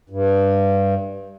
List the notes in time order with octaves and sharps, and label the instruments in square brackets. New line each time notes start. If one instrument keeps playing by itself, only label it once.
[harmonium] G2